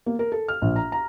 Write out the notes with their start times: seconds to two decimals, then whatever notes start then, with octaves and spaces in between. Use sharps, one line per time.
0.06 A#3
0.19 A#4
0.32 A4
0.48 F6
0.62 A#1
0.76 A#5
0.92 A#5